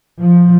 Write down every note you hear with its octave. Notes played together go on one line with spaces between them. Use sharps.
F3